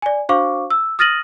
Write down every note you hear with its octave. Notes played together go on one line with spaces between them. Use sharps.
D5 G#5
D4 F#4 C5 F5 C#6 D6
E6
D#6 F6 A6 A#6 D#7 F#7